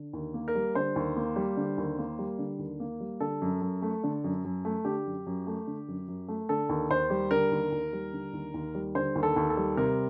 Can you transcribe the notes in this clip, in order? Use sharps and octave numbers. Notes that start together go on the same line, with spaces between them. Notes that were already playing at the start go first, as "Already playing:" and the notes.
Already playing: D3
D#2
A#3
A#4
G3
D3 C5
D#2
A#3
G3
D3
D#2
A#3
G3
D3
D#2
A#3
G3
D3 A4
F#2
F#2
A3
D3
F#2
F#2
A3
D3 G4
F#2
F#2
A3
D3
F#2
F#2
A3
D3 A4
D#2
D#2 C5
G3
D3 A#4
D#2
D#2
G3
D3
D#2
D#2
G3
D3 C5
D#2
A4
D#2
A4
G3
C3 A#4